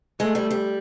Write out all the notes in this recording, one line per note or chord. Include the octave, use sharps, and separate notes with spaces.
G#3 A3
G3
G3